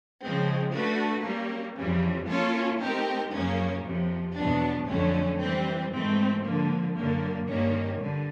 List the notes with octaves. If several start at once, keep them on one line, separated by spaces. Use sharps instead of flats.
C#3 F3 G#3 C4
A3 D4 F#4 B4
G3 A#3 C#4
F2 C#3 E3 G3
A#3 C#4 F4 A4 C#5
A3 C4 D#4 G4 A#4
F#2 C#3 F3 A#3 C#4
F2 C3 F3
E2 B2 F#3 B3 D4
F2 D3 F#3 A3 C#4
E3 G3 C4
G#2 E3 A3 C4
D3 F3 A#3
F#2 D3 F#3 A#3
G2 D#3 G3 A#3 C#4
G2 D3 G3